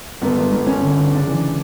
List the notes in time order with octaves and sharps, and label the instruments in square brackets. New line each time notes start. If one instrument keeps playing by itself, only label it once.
[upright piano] G1 B3
G1
G1
G1 C#4
D3
D3
C#3 D4
E3